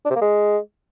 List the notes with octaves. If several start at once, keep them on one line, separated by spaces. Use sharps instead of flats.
D4
C3
A#3
G#3